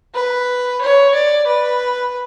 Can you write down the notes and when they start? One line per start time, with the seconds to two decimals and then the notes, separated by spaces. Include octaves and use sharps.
0.14 B4
0.81 C#5
1.14 D5
1.47 B4